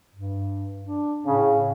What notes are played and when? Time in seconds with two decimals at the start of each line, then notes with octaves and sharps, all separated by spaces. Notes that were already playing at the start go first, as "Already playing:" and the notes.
0.14 G2
0.84 D4
1.26 A2 C#3